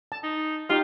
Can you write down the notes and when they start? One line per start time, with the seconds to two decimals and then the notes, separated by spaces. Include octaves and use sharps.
0.12 A5
0.24 D#4
0.70 D#4 F4 G4 F5